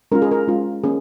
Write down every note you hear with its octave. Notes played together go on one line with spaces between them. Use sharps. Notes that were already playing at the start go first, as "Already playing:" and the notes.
G#3 C#4 F4 A#4
G#4
A#4
G#3 C#4 F4
A#3 C#4 G#4